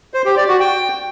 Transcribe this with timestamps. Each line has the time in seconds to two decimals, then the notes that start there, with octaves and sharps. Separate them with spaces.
0.14 C5
0.26 G4
0.37 D5
0.49 F#4
0.60 G5